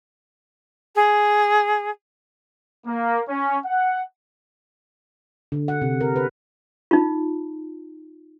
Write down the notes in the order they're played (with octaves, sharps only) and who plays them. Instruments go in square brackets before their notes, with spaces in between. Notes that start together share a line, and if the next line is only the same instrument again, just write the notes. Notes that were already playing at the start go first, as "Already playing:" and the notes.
[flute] G#4
[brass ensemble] A#3
C#4
F#5
[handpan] D3
F#5
C3
A#4
B4
[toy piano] D#4 F4